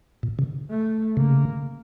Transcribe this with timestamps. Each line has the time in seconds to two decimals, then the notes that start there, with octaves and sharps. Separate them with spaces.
0.23 A#2
0.39 C#3
0.70 A3
1.16 C#3 A#3